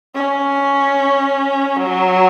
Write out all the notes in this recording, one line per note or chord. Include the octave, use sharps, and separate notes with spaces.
C#4
F#3